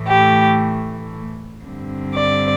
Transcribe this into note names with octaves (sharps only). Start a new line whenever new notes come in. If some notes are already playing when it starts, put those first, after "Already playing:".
Already playing: A2 E3 A3
G4
G2 D3 G3 C4
D5